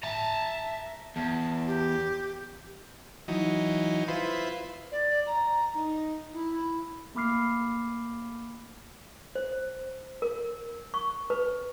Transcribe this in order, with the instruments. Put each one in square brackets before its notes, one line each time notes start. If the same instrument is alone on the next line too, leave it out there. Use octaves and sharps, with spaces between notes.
[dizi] E5 [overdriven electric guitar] A5 A#5
[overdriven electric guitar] E2 [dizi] A5
[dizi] G4
[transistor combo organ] E3 F#3 D#4
E4 F4 B4 C5
[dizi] D5
A#5
D#4
E4
[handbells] A3 A#3 B5 D6 F6 C7
[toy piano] C5
A#4
C#6
B4